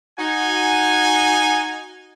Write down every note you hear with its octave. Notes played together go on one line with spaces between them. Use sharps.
D#4 F#4 G#5